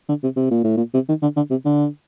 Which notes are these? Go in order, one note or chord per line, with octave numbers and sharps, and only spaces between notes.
D3
C3
C3
A#2
A2
A#2
C3
D#3
D3
D3
C3
D3